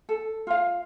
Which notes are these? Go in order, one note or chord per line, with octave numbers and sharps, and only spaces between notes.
A4
F4 F5